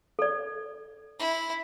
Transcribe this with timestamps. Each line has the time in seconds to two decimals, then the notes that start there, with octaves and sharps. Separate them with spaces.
0.19 A4 D5
1.19 E4